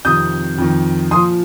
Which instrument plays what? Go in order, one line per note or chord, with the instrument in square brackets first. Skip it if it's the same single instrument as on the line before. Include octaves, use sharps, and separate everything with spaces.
[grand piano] F2 C3 D#3 D#6 G6
F2 D#3
A#2 F3 C6 D#6